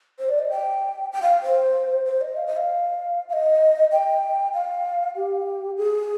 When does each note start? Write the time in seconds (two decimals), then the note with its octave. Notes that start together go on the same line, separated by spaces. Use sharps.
0.19 C5
0.29 D5
0.39 D#5
0.50 G5
1.12 G5
1.22 F5
1.43 C5
2.05 C5
2.21 D#5
2.37 F5
2.47 D#5
2.57 F5
3.29 F5
3.33 D#5
3.92 G5
4.54 F5
5.16 G4
5.77 G#4